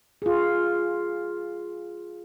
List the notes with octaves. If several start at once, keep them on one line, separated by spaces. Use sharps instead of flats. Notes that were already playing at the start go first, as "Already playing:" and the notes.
F4 G#4